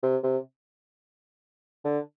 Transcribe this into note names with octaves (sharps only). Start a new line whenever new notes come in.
C3
C3
D3